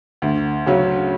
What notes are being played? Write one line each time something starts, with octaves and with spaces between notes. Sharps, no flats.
D2
C#3 F#3 C#4